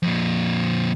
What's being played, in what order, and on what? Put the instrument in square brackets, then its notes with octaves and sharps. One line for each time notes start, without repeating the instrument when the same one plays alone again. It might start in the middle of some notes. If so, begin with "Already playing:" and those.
[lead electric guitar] F2 A#2